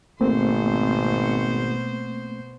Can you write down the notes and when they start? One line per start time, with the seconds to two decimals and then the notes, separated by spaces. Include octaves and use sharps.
0.21 G#1 B2 A3 A#3 C4 C5